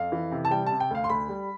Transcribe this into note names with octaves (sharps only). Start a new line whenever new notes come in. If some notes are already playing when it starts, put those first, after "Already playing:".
Already playing: F2 F5
E3
C3
A5
G3 G5
C3 A5
G5
D2 F5
C6
D2 B5
G3